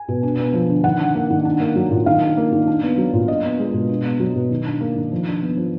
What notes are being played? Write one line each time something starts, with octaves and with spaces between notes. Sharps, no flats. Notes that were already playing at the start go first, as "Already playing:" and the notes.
Already playing: G#5
B2
D4
B3
F3
D3
D#3 F#5
D4
A#3
D#3
D4
A#3
F#3
A#2
D#3 F5
D4
A#3
D#3
D4
B3
F#3
A#2
D4 D#5
B3
G#3
B2
D4
B3
F#3
B2
D#3
D4
A#3
D#3
F3
D4
B3
F3